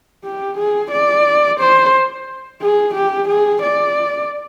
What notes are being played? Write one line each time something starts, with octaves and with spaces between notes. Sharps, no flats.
G4
G#4
D5
C5
G#4
G4
G#4
D5